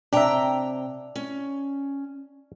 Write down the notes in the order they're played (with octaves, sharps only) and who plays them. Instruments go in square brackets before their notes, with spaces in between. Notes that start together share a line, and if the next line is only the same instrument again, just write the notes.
[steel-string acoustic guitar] C3 G5 A#5 [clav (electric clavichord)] D4 E5
[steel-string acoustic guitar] C#4